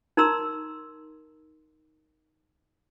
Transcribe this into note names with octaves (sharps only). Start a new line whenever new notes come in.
D#4 A#4 A#5 C6 E6